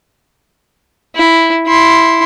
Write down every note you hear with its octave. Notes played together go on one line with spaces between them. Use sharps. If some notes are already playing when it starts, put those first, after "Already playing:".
E4
E4 C6